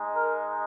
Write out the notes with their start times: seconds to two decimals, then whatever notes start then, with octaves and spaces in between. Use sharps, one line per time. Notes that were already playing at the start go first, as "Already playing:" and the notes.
Already playing: G#3 D#4
0.14 A#4